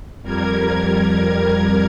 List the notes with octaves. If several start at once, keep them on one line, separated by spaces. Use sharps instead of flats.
F2 G3 A#4 G#6